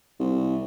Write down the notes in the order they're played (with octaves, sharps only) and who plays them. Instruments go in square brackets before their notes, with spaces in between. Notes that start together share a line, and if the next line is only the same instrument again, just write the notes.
[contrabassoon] C2